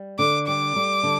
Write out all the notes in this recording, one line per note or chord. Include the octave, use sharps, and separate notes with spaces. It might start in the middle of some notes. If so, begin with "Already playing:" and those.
Already playing: G3
D3 D6
G3 D6
G3
D3